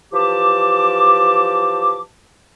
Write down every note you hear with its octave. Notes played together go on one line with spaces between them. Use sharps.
E3 F3 G4 A5 D6